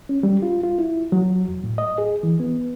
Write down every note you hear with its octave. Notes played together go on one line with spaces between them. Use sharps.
C#4
G3
F4
F4
E4
F#3
F2
A2
D#5
G#4
E3
B3